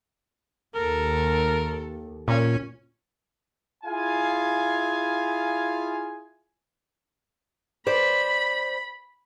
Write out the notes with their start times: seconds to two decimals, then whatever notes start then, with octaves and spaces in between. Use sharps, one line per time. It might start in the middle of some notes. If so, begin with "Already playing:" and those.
0.75 D#2 A4 A#4
2.28 A#2 C#4
3.84 E4 F4 G#4 F5 G#5
7.87 C5 D5 B5